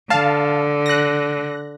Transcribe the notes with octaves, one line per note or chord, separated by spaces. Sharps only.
D3 F5 A5
F#6 A#6